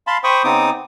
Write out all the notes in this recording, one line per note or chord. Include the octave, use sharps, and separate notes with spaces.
F5 A5 B5 C6
C5 G5 B5 C#6 D#6
C#3 B3 C4 D#4 D6 D#6